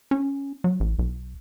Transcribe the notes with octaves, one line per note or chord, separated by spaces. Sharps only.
C#4
F#3
A1
B1